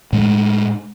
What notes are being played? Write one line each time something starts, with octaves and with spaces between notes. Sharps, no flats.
A2 G#3